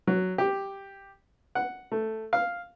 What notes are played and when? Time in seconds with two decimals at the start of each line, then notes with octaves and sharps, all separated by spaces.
0.07 F#3
0.38 G4
1.55 F#5
1.92 A3
2.33 F5